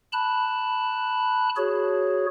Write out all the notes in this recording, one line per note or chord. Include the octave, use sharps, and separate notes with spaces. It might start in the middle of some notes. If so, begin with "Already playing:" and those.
A5 B5 F#6
F#4 G#4 C#5